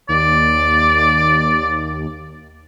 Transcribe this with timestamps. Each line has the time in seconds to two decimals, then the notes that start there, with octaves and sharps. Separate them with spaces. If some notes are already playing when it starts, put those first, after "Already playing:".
0.09 D#2 D5